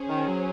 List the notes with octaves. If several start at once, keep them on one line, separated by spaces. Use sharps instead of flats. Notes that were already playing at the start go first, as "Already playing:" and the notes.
Already playing: C#4 G#4 C5
D#3
F#3